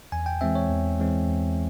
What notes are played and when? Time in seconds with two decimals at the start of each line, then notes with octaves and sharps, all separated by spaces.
0.12 E2 G#5
0.26 G5
0.41 E3 G#3 C4 E5
0.55 C#5
0.70 E2
0.99 E3 G#3 C4
1.28 E2